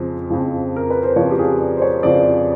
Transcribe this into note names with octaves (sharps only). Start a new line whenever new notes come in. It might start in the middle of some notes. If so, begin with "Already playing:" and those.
Already playing: F2 C#3 F3
F2 C#3 F3
A#4
B4
C5
F2 C#3 F3 C#5
G4
G#4
D5
C5
C#5
F2 C#3 F3 D5